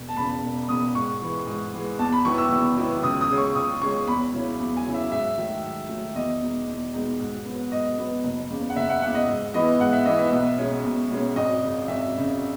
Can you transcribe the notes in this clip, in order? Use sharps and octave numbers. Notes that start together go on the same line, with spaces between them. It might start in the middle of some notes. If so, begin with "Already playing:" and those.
Already playing: E1
A5
E2 C#3 B5
E1
E2 C#3 D#6
G#2 C#6
E3 G#3
G#2
E3 G#3
E2 A5
B5
D#3 F#3 B3 E4 C#6
E6
E2
D#3 F#3 B3 E4
C#2 D#6
D#6
C#3 G#3 C#4
C#6
C#2 D#6
C#3 G#3 C#4 C#6
E2 B5
C#3 F#3 C#4 E4
E2
G#5
C#3 F#3 C#4 E4
E5
G#2 E5
D#3 F#3 A3
G#2
D#3 F#3 A3
E2 D#5
B2 G#3 D#4
E2
B2 G#3 D#4
G#2
F#3 B3
G#2 D#5
F#3 B3
F#1
E2 C#3
F#5
F#1 E5
F#5
E2 C#3 F#5
D#5
G#2
E3 B3 E4 D#5
G#2 F#5
E5
E3 B3 E4 D#5
E5
B1
B2 G#3 C#4
B1
B2 G#3 C#4
G#1 D#5
F#2 C#3
G#1 E5
F#2 C#3